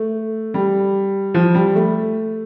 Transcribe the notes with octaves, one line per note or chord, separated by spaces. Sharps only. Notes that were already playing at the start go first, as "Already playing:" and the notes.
Already playing: A3
G3
F3
G3
A3